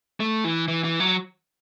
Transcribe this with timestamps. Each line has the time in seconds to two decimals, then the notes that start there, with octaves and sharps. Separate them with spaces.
0.20 A3
0.44 E3
0.68 E3
0.84 E3
1.00 F#3